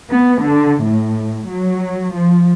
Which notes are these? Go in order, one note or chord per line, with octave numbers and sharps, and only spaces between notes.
B3
D3
A2
F#3
F3